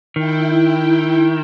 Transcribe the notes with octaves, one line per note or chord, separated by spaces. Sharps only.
D#3 E4 G5